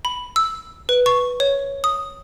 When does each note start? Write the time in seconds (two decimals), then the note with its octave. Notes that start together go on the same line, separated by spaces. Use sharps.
0.05 B5
0.36 E6
0.89 B4
1.06 C#6
1.40 C#5
1.84 D#6